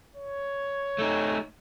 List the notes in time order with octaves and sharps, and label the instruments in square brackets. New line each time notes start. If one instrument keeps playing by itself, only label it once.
[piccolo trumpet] C#5
[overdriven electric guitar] A3 D#4